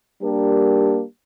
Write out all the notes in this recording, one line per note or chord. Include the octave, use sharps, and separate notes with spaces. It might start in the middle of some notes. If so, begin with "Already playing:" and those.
G3 A#3 D4 G4 A#4